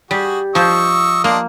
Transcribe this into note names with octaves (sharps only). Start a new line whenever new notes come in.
G3 F#4 G#4
F3 C5 D#5 C#6 E6
A#3 D4 D#5 C6